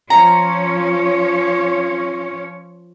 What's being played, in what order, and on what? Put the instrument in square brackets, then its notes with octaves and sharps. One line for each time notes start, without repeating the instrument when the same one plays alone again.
[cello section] F3 C#4 C#5 [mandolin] A#5